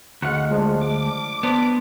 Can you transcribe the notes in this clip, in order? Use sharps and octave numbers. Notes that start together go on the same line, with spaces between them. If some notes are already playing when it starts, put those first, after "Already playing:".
D2 G#3 F5 F#5 C#6
F3 G#3 D4
D6
B3 D4 C5